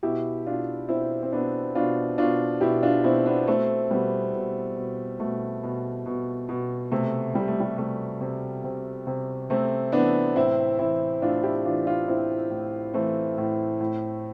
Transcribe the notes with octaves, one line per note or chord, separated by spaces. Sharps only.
B2 E4 G4
B2 D4 F4
B2 C4 E4
C4
B2 B3 D4
B2 D4 F4
B2 D4 F4
B2 E4 G4
D4 F4
B2 C4 E4
B3 D4
B2 A3 C4
B2 G3 B3
B2
B2
B2 A3
B2
B2
B2
C3 A3
C3 G3
A3
G3
C3 A3
C3
C3
C3
C3 A3 C4
E3 B3 D4
A2 C4 E4
E3 C4 E4
A2 D4 F4
E4 G4
E3 D4 F4
D4 F4
A2 C4 E4
A2
E3 A3 C4
A2
A2